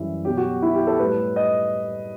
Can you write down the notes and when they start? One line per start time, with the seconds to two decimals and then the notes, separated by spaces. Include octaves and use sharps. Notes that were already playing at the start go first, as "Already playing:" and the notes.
Already playing: F#2 E3 G3 E5
0.25 B2 F#3 G4
0.37 F#4
0.62 E4
0.74 G4
0.87 A4
0.99 A2 G3 B4
1.36 D#5